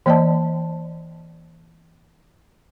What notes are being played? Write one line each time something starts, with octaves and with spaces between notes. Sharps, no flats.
E3 A#3 D5 D#5 A5